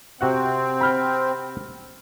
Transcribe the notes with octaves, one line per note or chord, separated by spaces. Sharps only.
C3 C4 F#4 F#5
B5 F6 G6